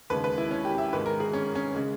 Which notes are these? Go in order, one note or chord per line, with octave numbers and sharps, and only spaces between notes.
D#2 C#3 G#3 B4
B4
E4
C#4
G4
E5
G#2 D#3 G#3 B4
A#4
G#4
C#4
C#4
C#3 G#3